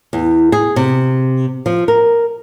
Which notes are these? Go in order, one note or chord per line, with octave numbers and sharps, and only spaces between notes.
E2
G#4
C3
F3
A#4